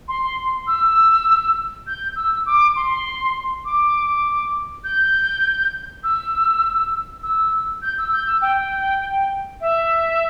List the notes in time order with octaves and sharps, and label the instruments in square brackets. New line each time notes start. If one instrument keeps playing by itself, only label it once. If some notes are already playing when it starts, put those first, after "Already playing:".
[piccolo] C6
E6
G6
E6
D6
C6
D6
G6
E6
E6
G6
E6
G6
E6
G5
E5